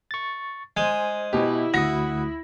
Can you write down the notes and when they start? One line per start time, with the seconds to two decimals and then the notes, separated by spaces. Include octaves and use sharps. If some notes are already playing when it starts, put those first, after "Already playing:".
0.11 C#6 A6
0.77 G#3 C5 G#5
1.33 B2 E4 G4
1.74 D2 F#4 D#6 A#6